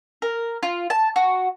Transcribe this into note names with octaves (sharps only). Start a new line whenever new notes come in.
A#4
F4
A5
F#4